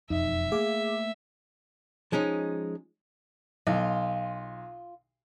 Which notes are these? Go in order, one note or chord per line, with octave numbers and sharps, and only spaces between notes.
E1 F2 D#4 E5
A3 A#3 G#4 F5 D6
F3 G#3 C#4 D#4
B1 F4